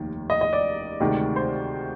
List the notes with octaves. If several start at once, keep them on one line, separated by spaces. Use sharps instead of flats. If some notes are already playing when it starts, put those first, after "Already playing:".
Already playing: F1 D#2 D#3
D#5
D#5
D5
D2 C3 D#3 G#3
C5